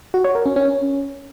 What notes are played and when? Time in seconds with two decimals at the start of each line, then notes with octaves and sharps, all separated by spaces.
0.14 F#4
0.24 C#5
0.35 A#4
0.46 C#4
0.56 C#4